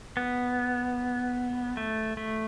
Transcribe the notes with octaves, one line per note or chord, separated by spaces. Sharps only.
B3
A3
A3